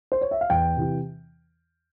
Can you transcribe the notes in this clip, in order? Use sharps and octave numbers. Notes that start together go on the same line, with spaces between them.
C5
C#5
E5
F5
E2 G5
C3 E3